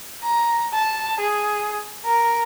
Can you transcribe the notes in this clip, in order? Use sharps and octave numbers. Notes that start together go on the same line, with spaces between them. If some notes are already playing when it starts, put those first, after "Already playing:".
A#5
A5
G#4
A#4